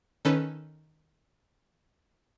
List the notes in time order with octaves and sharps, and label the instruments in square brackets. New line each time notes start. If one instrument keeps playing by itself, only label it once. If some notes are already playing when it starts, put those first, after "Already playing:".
[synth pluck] D#3 C#4 A4 B4